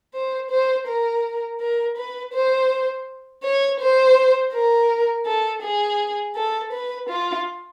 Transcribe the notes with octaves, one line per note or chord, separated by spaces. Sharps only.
C5
C5
A#4
A#4
B4
C5
C#5
C5
A#4
A4
G#4
A4
B4
F4